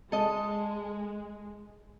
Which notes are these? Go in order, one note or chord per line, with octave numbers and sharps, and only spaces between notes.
G#3 A4 D#5